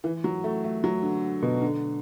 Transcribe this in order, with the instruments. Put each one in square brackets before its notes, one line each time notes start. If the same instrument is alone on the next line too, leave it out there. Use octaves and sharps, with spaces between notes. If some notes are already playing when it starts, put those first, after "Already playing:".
[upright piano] E3
F#3
A3
A3
F#3
D3
B2
D3